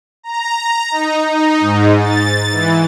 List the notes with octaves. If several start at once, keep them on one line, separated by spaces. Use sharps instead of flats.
A#5
A#5
D#4
D#4
G#2
A6
E3